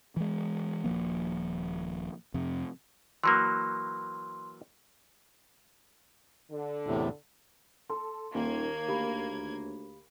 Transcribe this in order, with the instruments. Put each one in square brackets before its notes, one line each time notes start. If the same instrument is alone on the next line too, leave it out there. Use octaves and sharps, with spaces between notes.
[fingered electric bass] E3 G#3
D#1 G#1 F3 A#3
F2 C3
[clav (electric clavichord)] E3 F#3 A#3 [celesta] C6
[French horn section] D3
[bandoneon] E2 A2 C3
[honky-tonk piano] A4 [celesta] C6
[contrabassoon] D#1 [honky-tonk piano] D#2 [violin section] A#3 G#6
[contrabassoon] D2 [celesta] G4 F5 B5